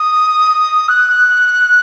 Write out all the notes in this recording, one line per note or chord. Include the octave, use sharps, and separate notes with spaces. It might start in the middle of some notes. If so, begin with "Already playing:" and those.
Already playing: D#6
F#6